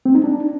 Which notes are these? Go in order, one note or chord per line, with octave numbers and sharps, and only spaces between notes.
C4
D#4
D4